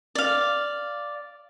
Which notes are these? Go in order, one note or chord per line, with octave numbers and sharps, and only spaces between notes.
D5 F5